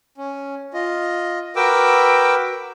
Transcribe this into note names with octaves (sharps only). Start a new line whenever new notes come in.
C#4
F4 D#5
F#4 A#4 B4 G5 D6 E6